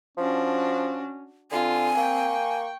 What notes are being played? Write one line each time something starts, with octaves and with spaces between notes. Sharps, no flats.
F3 C#4 D4 F#4
D3 C4 F4 G#5
A#3 G5 C#6